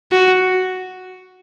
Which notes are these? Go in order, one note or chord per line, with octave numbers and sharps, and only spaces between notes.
F#4